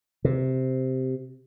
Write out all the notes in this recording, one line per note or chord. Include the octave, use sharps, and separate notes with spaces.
C3